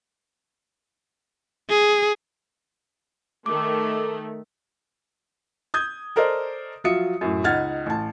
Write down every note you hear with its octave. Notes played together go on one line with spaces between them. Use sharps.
G#4
D#3 A3 D6
D#6 G6 G#6
A4 A#4 C5 D5 D#5
F3 F#3 F4 E5 D#6 C#7
F#2 A2
C#2 D#4 F#5 F6 G#6 A6
A1 A5